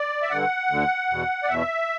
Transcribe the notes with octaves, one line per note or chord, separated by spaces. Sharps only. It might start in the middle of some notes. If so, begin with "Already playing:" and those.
Already playing: D5
E5
G2 D3 F#5
D2 D3
E2 B2
D5
E2 B2 E5